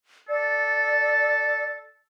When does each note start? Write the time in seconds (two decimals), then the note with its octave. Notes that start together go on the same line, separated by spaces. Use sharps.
0.29 A4 D5